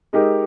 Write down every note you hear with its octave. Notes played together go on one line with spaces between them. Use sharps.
G#3 D#4 G4 A#4